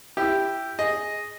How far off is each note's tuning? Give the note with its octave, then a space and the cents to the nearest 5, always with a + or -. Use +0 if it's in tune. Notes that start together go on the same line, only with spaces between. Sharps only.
E4 +10 G4 +0
G#4 +0 D#5 +0